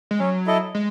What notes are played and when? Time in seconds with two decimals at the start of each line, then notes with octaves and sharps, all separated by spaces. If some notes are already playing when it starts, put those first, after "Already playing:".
0.11 G#3
0.19 F#3 C#4
0.47 E4 A4 D#5
0.75 G#3